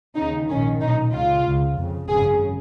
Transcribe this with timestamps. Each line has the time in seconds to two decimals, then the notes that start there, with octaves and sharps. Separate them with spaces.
0.16 D#2 C#3 D#4
0.49 A#1 G#2 D#3 C#4
0.81 B1 A#2 D#4
1.13 C#2 C#3 F4
1.45 C#2 C#3
1.78 F2 C#3
2.10 G#1 F#2 C#3 G#4